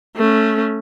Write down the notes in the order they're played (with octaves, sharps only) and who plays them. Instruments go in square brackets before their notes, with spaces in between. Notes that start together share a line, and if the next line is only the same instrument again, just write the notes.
[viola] A3 C#4